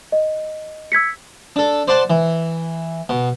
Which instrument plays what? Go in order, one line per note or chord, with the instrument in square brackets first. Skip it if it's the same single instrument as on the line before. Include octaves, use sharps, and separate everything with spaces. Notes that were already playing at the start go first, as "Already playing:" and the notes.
[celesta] D#5
E6 G#6 B6 C#7
[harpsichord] D4 A4
C5 D5 F#5 A5 C6
E3
B2